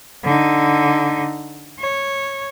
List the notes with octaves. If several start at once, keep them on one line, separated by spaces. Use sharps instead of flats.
D3 D#4
C#5